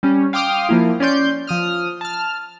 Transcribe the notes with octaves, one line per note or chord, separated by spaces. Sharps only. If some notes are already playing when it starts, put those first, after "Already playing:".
G3 C#4
F5 G5 C6 D6 D#6 F6
F3 A#3 E4
C#4 D5 C6 G6
F3 D#6 F6
A5 F6